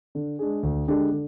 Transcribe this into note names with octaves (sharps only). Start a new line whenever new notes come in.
D3
G#3 D4 G#4
D2
D3 G#3 D4 G4
D3